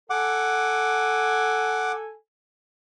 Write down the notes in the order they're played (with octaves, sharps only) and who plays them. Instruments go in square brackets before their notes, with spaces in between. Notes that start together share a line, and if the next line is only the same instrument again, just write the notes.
[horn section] A4 G#5 [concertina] F#5 D6